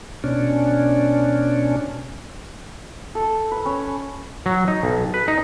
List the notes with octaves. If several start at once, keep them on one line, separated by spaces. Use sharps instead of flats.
B2 C#4 D4
A4
B4
C#4
F#3
D#4
B1
B4
D#4